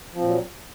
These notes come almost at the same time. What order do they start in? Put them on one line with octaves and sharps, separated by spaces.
F3 C4 A#2 F#3